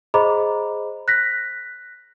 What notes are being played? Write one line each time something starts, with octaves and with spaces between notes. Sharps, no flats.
G#4 C5 D#5 A#5 B5 D6
F#6 A#6 B6